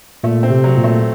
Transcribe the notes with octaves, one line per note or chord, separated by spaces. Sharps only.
A#2 A3
C4
C3
F#3
A#2
A3